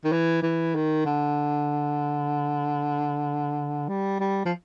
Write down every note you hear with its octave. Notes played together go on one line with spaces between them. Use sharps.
D#3
E3
E3
D#3
D3
G3
G3
F3